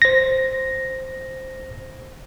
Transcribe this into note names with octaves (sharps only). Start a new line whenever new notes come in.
C5 A#6